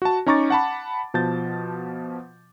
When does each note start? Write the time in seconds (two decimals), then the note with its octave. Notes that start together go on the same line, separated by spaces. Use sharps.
0.02 F#4 A5
0.26 C#4 D#4 A#5 C#6 D6 A6
0.50 F#5 A5 B5
1.14 B2 F3 A5 G6 A6